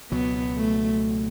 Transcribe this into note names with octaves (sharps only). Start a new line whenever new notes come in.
C#2 B2 F#3 B3
A3